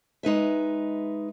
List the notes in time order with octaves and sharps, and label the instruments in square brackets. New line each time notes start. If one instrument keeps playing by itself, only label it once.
[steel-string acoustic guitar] G#3 D#4 B4 E5